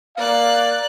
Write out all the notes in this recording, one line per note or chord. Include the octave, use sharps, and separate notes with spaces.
A#3 D5 F5 F#6